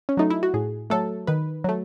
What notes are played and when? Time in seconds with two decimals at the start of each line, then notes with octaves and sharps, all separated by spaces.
0.09 C#4
0.17 F#3 A3 D#4
0.30 E4
0.43 F#4
0.54 A2 G#4
0.90 F#3 A3 A4
1.27 D#3 B4
1.64 F#3 A3